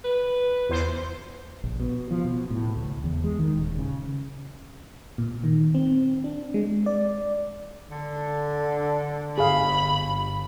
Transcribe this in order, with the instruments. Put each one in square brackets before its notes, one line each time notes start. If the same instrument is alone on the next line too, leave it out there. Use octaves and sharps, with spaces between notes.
[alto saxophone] B4
[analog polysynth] E2 C5
[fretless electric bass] A#1
B2
F3
B2
A2
C#2
E2
G#3
D#3
D#1
C#3
[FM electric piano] A#2
D#3
C4
D4
G#3
D5
[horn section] D3
[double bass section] G1 [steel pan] G#4 F5 [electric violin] B5